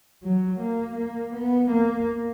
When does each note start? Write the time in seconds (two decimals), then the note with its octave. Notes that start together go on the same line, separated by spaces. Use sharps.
0.23 F#3
0.60 A#3
0.97 A#3
1.34 B3
1.71 A#3